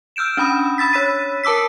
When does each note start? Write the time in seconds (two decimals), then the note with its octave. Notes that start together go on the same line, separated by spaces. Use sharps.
0.16 E6 F6 G6 D7 E7
0.37 C#4 D4 B5 D#6
0.78 B5 E6 A6 B6
0.93 C#5 B5 E6 B6 D#7
1.44 A#4 A5 D6 E6 B6